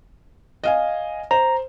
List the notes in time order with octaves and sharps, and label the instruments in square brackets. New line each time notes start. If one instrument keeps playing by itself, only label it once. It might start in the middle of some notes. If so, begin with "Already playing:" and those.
[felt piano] D#5 F5 G#5
[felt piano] C5 [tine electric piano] A#5